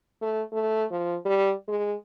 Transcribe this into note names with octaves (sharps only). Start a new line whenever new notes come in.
A3
A3
F3
G3
G#3